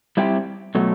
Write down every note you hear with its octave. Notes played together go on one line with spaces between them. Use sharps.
G3 C4 E4 G4
B2 F#3 A3